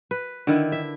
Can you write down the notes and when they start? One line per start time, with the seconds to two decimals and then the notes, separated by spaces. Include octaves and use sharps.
0.11 B4
0.47 D3 D#3 E4
0.72 E5